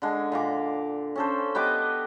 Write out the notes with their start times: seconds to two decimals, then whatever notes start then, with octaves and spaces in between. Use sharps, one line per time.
0.02 D3 G#3
0.32 A#2 F5 D6
1.16 C#4 A4 C5
1.55 B3 G4 D#5 D6